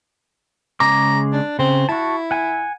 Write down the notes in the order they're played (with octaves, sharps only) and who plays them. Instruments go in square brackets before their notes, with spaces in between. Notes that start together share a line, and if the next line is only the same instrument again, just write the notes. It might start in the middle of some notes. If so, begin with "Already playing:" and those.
[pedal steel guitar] C#3 G#3 D6 [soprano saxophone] A#5
[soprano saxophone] D4
[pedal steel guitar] C#3 [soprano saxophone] C4
[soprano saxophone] E4 [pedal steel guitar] F#4 A5
[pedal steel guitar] F#5 G#5